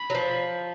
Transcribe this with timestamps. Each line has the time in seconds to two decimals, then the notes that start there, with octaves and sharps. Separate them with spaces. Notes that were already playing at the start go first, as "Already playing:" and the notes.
Already playing: B5
0.10 F#3
0.15 F3